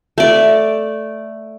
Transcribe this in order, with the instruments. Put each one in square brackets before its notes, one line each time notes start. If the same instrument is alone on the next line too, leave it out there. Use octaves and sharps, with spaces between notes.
[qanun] A3 D5